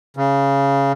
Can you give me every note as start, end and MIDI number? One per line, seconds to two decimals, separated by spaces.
0.17 0.92 49